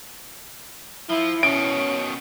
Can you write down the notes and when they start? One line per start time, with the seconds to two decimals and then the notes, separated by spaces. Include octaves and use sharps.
1.10 F3 E4
1.43 B2 D#3 C#4 D7